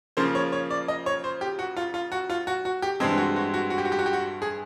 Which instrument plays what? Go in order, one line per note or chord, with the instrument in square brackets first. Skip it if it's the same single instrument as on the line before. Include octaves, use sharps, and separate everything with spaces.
[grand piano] C#3 F3 A#3 C5
C#5
C#5
D5
D#5
C#5
C5
G4
F#4
F4
F4
F#4
F4
F#4
F#4
G4
G2 E3 G#3 C4 G#4
F#4
F#4
F#4
F#4
G4
F#4
G4
F#4
G4
F#4
G#4